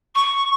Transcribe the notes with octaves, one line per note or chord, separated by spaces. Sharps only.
C#6